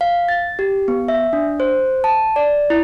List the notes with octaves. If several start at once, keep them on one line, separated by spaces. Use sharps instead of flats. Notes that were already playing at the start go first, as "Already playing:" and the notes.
F5
A6
G4
B3
E5
D4
C5
A5
D5
E4